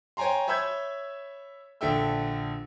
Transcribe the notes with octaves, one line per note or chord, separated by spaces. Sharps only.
C#5 G5 G#5 A#5 C6
C#5 E5 B5 E6 G6 G#6
A#1 D3 A4 E5 G5 E6